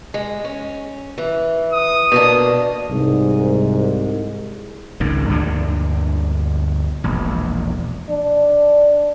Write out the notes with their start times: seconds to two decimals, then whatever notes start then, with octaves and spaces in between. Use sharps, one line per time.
0.14 G#3
0.45 C#4
1.18 E3
1.73 D#6
2.12 B2 A#3 D4
2.90 C2 G#2
5.00 G#1 C#2 G#2 D#3
5.28 D2 G2 A#2 D3
7.04 E1 A#1
8.09 D4